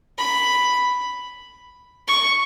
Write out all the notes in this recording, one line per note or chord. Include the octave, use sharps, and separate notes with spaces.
B5
C#6